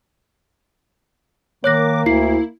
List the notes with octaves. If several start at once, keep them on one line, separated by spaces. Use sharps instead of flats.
D#3 A#3 C#5 D6 F#6 A#6
D2 E4 C7